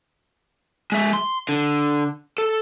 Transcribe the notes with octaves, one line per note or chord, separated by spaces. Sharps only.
G#3 E5
C6
D3
A4